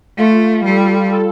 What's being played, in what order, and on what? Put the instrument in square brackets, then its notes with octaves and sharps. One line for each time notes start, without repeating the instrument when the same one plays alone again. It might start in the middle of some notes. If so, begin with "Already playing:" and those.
[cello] A3 [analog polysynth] F4
[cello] G3 [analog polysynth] A4
[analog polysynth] A4